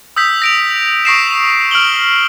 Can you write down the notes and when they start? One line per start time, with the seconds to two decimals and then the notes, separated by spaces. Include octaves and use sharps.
0.16 D#6 E6 G6 B6
0.42 A#6 D7 F7
1.05 C#6 D#6 A#6 C7 D7 E7
1.71 F6 D7 F#7 G7